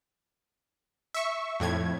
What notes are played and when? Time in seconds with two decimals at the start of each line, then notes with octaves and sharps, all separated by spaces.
1.14 E5 C#6
1.60 F2 A2 G#6